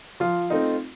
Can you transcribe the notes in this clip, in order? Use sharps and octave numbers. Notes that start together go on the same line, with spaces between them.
F3 F4
A3 C4 D#4